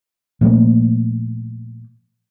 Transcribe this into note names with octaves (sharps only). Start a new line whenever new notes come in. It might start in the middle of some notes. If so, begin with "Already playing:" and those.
A#2 F3 A3 A#3